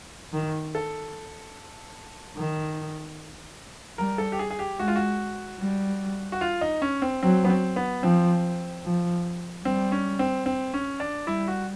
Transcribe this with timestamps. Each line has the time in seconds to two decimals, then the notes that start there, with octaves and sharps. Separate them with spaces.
0.33 D#3
0.75 A4
2.37 D#3
3.98 G3 A#4
4.18 A4
4.32 G4
4.39 G#4
4.50 G#4
4.59 G4
4.79 G#3 F#4
4.88 F4
4.96 F#4
5.61 G3
6.32 F#4
6.41 F4
6.61 D#4
6.82 C#4
7.02 C4
7.23 F#3 C4
7.45 B3
7.50 C4
7.76 B3
8.03 F3 C4
8.84 F3
9.65 G3 C4
9.92 C#4
10.19 C4
10.46 C4
10.74 C#4
11.00 D4
11.27 G3 E4
11.48 F#4